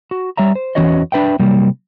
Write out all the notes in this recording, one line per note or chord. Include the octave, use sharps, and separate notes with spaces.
F#4
G3 C#5 E5 A#5
C5
E2 E3 C#4 F#4 C#5 D#5
D4 B4 E5 G5
C3 F#3 G3 A#3